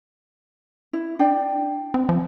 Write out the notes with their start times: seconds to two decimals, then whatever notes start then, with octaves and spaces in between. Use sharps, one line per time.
0.93 E4
1.19 D4 D5 G5
1.94 C4
2.09 F3